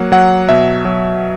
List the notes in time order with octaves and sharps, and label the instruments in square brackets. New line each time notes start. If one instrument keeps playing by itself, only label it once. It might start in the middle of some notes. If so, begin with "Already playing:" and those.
Already playing: [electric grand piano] F#3 A#3 F#5
F#3 F#5
B2 E5
F#3